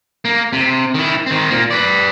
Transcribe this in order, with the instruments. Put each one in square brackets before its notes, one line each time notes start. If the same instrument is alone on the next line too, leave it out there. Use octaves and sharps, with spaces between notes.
[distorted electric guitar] A#3
C3
D#3 E4
D#3 C4
A#2 A#3
B4 D5